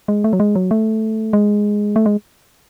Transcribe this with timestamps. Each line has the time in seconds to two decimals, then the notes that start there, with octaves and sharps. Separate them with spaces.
0.08 G#3
0.24 A3
0.33 F#3
0.40 G#3
0.55 F#3
0.71 A3
1.33 G#3
1.96 A3
2.06 G#3